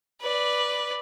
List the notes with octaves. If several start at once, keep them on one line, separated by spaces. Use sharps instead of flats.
B4 D5